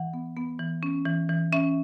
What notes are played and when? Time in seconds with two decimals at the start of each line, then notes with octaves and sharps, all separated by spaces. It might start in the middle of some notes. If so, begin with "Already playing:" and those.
Already playing: E3 F#5
0.13 B3
0.37 B3
0.59 E3
0.83 C#4
1.05 E3
1.29 E3
1.52 C#4 E5